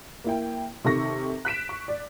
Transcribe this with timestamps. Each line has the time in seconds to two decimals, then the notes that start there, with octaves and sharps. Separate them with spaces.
0.24 A#3 E4 G5
0.84 C3 D#3 A4 C#6 A#6
1.45 F#6 B6 D7 E7
1.69 C#6
1.88 D5